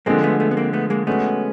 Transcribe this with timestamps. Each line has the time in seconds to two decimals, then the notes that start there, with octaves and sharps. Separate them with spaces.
0.06 D3 F3 G#3 A#3 C4
0.23 A3 B3
0.40 A3 B3
0.51 B3
0.57 A#3 C4
0.73 A3 B3
0.90 G#3 A#3
1.07 G#3 A3 B3 C#4 F#4